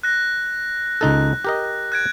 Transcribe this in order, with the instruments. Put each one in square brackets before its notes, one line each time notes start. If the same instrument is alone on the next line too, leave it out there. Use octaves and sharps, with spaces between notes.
[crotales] F#6 A#6
[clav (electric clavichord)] C#2 D#4 A4 [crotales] F#6
[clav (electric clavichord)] G4 A#4 D#5
[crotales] F#6 G#6 D7